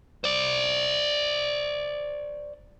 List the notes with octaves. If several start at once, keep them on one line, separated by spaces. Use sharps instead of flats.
C5 D5